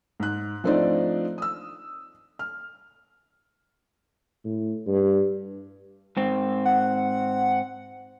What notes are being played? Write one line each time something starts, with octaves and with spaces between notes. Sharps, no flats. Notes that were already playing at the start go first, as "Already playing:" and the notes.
G#2 F#6
F3 A3 C4 D4 D#4 D5
D#6 E6
F6
A2
G2
G#2 C4
F#5